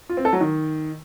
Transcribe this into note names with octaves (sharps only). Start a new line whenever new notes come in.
F4
C4
A4
F#3
D#3